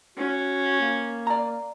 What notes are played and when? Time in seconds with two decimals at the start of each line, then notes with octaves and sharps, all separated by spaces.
0.18 C#4 F#4
0.81 A#3
1.27 D5 A#5